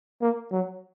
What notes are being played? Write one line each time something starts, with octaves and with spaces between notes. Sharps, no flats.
A#3
F#3